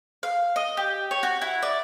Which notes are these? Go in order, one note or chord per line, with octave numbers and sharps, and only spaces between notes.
F5
D#5
G4
C#5
F#4
E4
D5